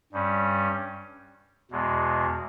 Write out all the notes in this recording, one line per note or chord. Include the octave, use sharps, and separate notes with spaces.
G2 G3 C#4
E2 B2 G#3